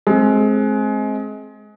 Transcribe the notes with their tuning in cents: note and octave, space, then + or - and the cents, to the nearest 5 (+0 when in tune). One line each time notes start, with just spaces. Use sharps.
G#3 +25 C4 +15